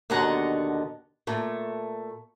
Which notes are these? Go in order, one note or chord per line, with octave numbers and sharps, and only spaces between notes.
D#2 B2 D3 D#5 F#5 A#5
A#2 A3